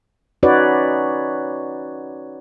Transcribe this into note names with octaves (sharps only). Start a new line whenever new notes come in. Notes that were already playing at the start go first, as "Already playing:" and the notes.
C#4 D#4 F#4 B4 C#5 D5